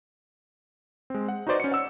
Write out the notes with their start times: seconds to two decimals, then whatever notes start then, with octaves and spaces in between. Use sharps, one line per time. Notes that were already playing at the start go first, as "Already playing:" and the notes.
1.10 G#3 C4
1.28 F#5
1.47 D#4 F#4 B4 C5 D5 D#5
1.60 C#4 C#7
1.72 F#5 E6